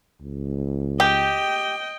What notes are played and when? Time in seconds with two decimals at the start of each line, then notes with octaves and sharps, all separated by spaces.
0.21 C#2
1.00 G4 D#5 G5